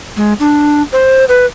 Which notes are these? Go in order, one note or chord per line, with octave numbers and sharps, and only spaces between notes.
G#3
D4
C5
B4